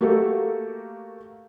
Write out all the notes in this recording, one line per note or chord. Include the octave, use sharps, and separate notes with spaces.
A3 A#3 F#4 G4 A4 A#4